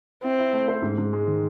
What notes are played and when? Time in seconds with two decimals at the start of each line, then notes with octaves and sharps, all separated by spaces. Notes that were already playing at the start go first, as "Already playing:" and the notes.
0.23 C4 E4
0.39 E4
0.53 A3
0.68 C5
0.82 G#2
0.98 G#2
1.13 G#3
1.27 D#3